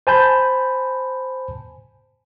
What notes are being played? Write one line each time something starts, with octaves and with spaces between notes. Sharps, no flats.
C5 G#5 A5 B5 G6